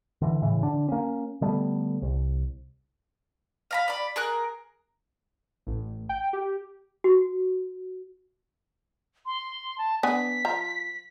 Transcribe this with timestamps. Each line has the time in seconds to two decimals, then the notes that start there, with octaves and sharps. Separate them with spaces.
0.22 D3 E3
0.42 A2 C#3 E3
0.63 D3 D4
0.89 A#3 C#4
1.41 D3 G3 A3 B3
2.02 C2
3.71 F5 A#5 B5
3.88 D5 B5
4.16 G#4 A#4 F#6
5.67 A1
6.09 G5
6.33 G4
7.04 F#4
9.26 C6
9.78 A5
10.03 B3 D4 G#5 B6
10.45 F3 A#5